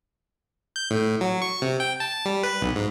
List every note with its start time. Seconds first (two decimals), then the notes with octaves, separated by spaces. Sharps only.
0.76 G6
0.91 A2
1.21 F#3
1.42 C#6
1.62 C3
1.80 G5
2.00 A5
2.25 G3
2.44 B4
2.62 B1
2.76 G#2